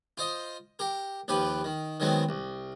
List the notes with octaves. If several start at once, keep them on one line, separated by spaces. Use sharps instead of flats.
F4 C5 D#5
G4 A#4
D#2 F3 G4 B4
D#3
D#3 F#3 G#3 B3 C4
C2